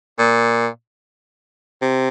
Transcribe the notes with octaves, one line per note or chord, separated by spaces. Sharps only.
A#2
C3